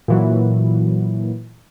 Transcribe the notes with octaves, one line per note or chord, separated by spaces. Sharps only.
A#2 E3 F#3